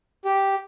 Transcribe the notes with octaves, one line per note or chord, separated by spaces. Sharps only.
G4